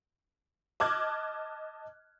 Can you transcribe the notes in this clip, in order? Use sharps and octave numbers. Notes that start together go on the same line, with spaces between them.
D#5 A5 D6 F6 F#6 G#6